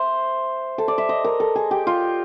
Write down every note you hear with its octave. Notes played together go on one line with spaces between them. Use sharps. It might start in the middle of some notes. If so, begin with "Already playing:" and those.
Already playing: C5 E5
A4
D5
E5
D#5
A#4
A4
G#4
G4
F4